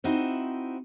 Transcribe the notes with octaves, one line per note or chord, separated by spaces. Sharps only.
C4 D#4 E4 F#4 C5